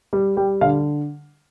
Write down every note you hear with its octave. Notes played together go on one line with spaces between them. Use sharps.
G3
G3 G5
D3 F5